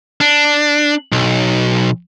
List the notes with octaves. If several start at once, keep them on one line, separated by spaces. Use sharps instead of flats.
D4
B1